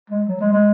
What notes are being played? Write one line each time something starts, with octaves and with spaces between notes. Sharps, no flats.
G#3
F#3
G#3
G#3